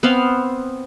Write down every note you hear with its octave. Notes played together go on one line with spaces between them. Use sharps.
B3 C4 F5 C6